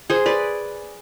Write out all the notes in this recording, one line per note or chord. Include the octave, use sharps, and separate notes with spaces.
G#4 C5
B4 D5